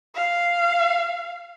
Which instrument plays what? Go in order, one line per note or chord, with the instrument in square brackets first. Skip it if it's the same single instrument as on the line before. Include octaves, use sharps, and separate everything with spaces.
[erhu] F5